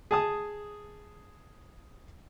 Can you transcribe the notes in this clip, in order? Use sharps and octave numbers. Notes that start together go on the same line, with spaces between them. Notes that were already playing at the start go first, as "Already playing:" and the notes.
G#4 A5 D#6